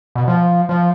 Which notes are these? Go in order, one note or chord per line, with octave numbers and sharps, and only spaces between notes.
B2
F3
F3